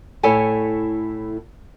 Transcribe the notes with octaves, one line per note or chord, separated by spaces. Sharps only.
A2 E4 A4 C#5 G#5